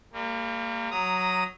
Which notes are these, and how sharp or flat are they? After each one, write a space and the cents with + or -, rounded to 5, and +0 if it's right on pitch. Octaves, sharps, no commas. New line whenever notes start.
G3 +35 A#3 -25
F#3 +0 A#5 +0 D#6 +0